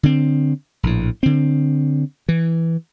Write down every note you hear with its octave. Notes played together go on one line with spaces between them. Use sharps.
D3 C4
A#1 A2
D3 C4
E3